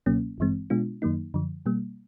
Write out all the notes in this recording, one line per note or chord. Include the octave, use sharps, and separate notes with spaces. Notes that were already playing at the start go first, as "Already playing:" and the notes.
C#2 B2 F#3 A#3 C#4
G#1 G2 E3 G#3 C4
B2 G#3 B3 D4 F4
F#2 D#3 F#3 A#3 D#4
F#2 D3 F3
B2 G3 A#3